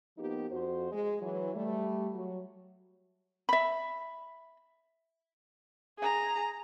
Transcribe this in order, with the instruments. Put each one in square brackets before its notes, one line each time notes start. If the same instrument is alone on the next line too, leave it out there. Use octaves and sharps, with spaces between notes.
[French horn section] F3 A#3 B3 D#4 G4
F2 F#4 C5
G#3
E3 F#3
G3 A3
F#3 F#4
[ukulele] E5 B5
[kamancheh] G#4 A#5